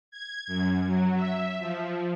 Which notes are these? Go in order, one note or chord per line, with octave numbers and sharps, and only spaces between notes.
G#6
F#2
F#3
E5
F3